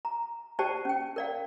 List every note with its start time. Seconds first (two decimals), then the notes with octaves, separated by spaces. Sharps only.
0.05 A#5
0.59 G4 C5 D5 G5 A5
0.85 C#4 G5
1.16 A#4 D5 F5